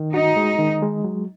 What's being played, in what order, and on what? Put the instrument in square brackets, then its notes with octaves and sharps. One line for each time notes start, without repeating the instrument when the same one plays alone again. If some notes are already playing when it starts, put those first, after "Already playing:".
Already playing: [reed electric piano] D#3
[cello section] D#4 [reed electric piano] F#4
[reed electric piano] G#3
D#3
G#3
F#3